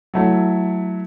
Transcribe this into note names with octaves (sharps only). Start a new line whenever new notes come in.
F#3 A3 E4